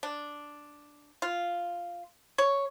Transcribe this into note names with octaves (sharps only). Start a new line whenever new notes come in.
D4
F4
C#5